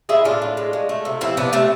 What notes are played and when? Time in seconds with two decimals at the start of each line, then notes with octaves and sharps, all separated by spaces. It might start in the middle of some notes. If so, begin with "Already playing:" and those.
0.09 G#3 E4 G#4
0.25 A2 D4 F4
0.42 A2
0.57 G#3
0.73 G#3
0.89 A3
1.05 C3
1.21 F3 C4 E4
1.37 C3 B3 D4
1.53 C3 A3 C4